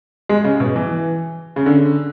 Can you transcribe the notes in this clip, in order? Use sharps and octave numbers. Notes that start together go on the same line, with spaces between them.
G#3
C#3
B2
E3
C#3
D3